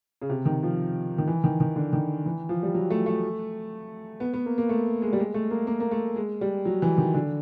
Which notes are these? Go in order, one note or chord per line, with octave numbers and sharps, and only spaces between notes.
C#3
C3
D#3
F3
D#3
E3
D#3
D#3
D3
D#3
E3
F3
G3
F#3
A3
A3
B3
B3
A#3
A#3
A3
G#3
G3
G#3
A3
A#3
A#3
A#3
A3
G#3
G3
F#3
E3
D#3
D3